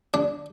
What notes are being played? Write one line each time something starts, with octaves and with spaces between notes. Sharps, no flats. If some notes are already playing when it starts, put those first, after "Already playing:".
D4